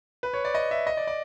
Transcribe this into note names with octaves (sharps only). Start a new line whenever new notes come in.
B4
C#5
D5
D#5
E5
D#5
D5
D5